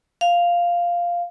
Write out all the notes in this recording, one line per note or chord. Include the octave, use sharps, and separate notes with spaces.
F5